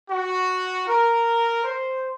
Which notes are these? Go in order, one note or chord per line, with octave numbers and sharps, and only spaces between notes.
F#4
A#4
C5